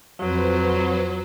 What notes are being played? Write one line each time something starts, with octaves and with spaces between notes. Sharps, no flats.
F2 F#3 B4 C5